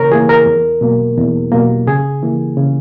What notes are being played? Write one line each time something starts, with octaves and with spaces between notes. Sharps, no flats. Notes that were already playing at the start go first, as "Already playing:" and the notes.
Already playing: C#3 E3 A#3 A#4 C#5
E3 A#3 G#4
A#4
E2
B2 F#3 A#3
E2
B2 F#3 A#3
C#3 G#4
E3 A#3
C#3